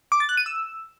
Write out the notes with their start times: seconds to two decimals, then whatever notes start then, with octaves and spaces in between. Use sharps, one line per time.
0.12 D6
0.20 A6
0.29 F#6
0.37 D#7
0.46 E6